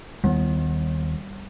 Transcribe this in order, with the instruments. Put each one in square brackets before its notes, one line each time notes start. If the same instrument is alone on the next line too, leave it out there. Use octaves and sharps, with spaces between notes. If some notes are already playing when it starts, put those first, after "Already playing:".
[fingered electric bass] D#2 D#3 B3 [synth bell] G3